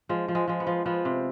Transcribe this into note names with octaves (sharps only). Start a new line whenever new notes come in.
F3 G#3
F3
G#3
F3 G#3
B3
F3
F3 B3
C3